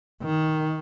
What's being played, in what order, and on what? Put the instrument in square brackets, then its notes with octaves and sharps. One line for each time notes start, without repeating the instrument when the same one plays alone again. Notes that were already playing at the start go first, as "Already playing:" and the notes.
[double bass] D#3